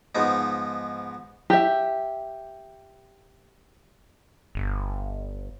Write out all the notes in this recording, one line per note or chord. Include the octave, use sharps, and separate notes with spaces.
G#2 F3 B3 D#4
G4 E5
G1